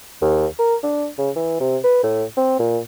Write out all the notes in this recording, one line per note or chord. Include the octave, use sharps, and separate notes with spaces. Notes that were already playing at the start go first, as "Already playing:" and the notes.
D#2
A#4
D4
C#3
E3
C3
B4
A2
C4
A#2